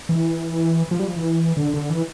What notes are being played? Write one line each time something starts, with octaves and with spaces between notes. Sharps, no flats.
E3
F3
G3
F3
E3
D3
D3
E3